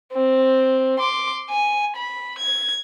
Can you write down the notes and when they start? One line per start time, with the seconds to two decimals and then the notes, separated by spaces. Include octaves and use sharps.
0.13 C4
0.99 C6 D6
1.50 G#5
1.97 B5
2.38 G#6